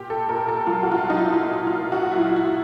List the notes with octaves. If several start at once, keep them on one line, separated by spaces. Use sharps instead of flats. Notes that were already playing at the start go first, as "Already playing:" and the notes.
Already playing: A#2 G4
A4
A#2 A#4
A4
F#3 F4
F#4
F4
F#3
D#4
E4
F4
A#2 E4
F4
A#2
F#4
E4
F#3 F4
F4
E4